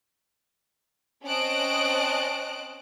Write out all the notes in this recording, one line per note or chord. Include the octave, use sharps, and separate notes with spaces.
C4 C#4 D#5 A5 F#6 D7